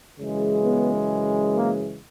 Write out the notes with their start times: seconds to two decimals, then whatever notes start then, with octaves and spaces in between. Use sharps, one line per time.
0.19 F#2 C#3 E3 G#3
0.64 B3
1.55 A#3